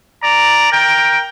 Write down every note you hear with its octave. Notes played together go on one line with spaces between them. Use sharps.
D5 A#5
A#4 G5